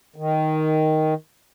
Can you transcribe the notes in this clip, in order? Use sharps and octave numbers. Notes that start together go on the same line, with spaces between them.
D#3